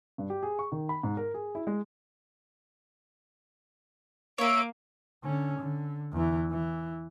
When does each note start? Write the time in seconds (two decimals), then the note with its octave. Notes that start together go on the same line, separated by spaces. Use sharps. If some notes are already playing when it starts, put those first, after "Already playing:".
0.18 G2
0.30 G4
0.43 G#4
0.59 C#6
0.72 D#3
0.89 B5
1.03 G#2
1.17 A#4
1.34 G#4
1.55 E4
1.67 G#3
4.38 A#3 C#5 E5 D7
5.24 D3 C#4
5.59 D3
6.12 E2 E3
6.51 E3